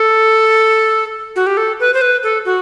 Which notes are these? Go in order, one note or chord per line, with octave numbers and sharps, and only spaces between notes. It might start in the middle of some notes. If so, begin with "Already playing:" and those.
Already playing: A4
F#4
G4
A4
B4
C5
B4
A4
F#4